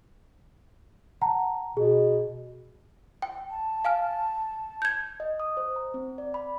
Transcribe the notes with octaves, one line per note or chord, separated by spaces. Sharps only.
F#5 A5 A#5
B2 G#4
G5
A5
F5 G#5 F6
G6 G#6
D#5
D#6
C5
A#5
C4
D5
B5